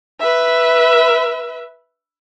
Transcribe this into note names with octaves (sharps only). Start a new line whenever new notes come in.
B4 E5